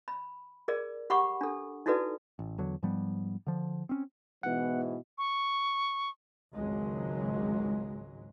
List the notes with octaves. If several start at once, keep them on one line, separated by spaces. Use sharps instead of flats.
B5
G#4 A#4 D5
G4 F#5 B5 C#6 D6
D4 A4
D#4 E4 F#4 A4 B4 D5
A1
E2 D3 F#3
G#2 F3 G3 B3
D3 F3
C4 C#4
G#2 B2 E3 B3 F#5
C#6
G#1 C#2 F#3 G#3